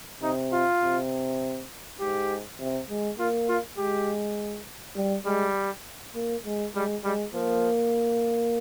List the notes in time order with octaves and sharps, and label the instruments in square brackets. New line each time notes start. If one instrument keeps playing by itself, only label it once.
[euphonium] C3 [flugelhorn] D#4
[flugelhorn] F4
[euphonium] C3
[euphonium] G#2 [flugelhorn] G4
[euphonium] C3
G#3
[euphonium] A#3 [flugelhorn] F4
[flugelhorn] F4
[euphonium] G#3 [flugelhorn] G4
[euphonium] G3
[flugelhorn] G3 [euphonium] G#3
[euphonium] A#3
G#3
[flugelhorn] G3 [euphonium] G#3
[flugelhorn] G3 [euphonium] G#3
[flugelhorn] F3 [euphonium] A#3